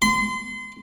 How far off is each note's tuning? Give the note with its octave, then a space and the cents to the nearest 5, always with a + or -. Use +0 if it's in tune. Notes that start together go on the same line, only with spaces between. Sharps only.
C6 -30